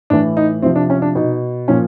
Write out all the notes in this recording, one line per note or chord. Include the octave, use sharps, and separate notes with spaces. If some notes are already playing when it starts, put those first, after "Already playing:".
A2 E3 D4
D#4
C3 F3 C4
D4
C#4
D4
B2 D#4
A#2 F3 C#4